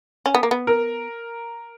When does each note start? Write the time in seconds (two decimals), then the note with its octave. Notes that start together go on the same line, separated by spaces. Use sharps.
0.26 C#4
0.35 B3
0.43 A#3
0.51 B3
0.67 A#4